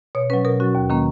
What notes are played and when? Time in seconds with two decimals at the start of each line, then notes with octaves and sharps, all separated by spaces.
0.15 B2 C#5
0.30 F#3 C#4 B4
0.45 B2 A#4
0.60 F#3 C#4 F#4
0.75 D#2
0.90 D#3 A#3 C#4